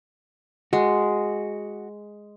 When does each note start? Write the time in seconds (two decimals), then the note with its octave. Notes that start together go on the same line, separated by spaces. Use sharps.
0.73 G#3 F#4